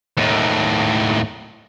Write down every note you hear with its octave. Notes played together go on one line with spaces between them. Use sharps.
D#2 A2